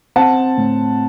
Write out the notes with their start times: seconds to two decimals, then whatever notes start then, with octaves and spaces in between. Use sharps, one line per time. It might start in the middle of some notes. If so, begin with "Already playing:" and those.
0.16 C4 F#5 A5
0.57 A2